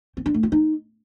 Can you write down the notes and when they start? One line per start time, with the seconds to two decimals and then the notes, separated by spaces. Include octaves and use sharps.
0.17 C4
0.26 D4
0.34 A3
0.43 F4
0.52 D#4